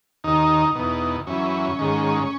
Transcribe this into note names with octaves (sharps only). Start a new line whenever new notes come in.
D#2 D#3 D#4
E2 B2
F#2 E3 C#4
G#2 D#3